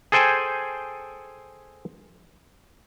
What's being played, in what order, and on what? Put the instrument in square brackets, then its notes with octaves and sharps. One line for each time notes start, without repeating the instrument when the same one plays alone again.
[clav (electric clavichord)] G#4 A4 C5 G5 G#5